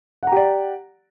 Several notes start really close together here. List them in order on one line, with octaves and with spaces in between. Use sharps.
F#5 A#5 G4 D5